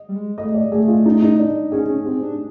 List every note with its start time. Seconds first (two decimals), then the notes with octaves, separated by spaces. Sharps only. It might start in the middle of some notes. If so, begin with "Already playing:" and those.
Already playing: D#5
0.09 G3
0.16 G#3
0.38 A3 D#5
0.54 D5
0.72 A3 G#4
0.88 F4
1.06 D#4
1.23 D#4
1.39 D4
1.72 C#4 G#4
1.89 C#4
2.05 C4 G4
2.22 D4